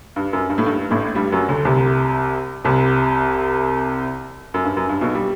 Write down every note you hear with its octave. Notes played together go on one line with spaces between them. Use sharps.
G2
F#2
G2
A2
G2
A1 A2
G2 G3
F#2 F#3
D2 D3
C2 C3
C2 C3
F#2
G2
F#2
G2
B1 B2
G3